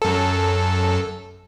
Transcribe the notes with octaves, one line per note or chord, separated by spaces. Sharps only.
F#2 A4